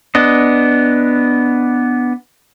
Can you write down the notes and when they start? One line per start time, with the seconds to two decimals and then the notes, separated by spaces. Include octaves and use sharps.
0.15 B3 D4 D#5